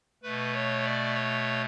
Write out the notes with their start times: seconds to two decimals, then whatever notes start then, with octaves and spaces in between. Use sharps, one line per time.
0.23 B2 A3 B4
0.54 C#5
0.84 D5
1.14 C#5